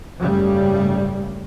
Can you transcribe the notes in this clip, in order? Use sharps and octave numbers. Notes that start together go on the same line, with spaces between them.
F#1 G#2 C#3 G3 A3